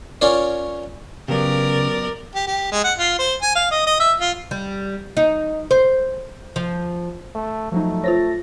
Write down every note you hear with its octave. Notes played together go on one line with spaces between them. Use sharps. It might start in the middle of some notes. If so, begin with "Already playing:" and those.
C#4 F4 A#4 C#5 D5
C#3 F#3 B3 G4 A#4 D5
G4
G4
G#3
F#5
F4
C5
G#5
F5
D#5
D#5
E5
F4
G3
D#4
C5
F3
A3
F3 F#3 A3 D#4
F4 C5 C#5 A6 A#6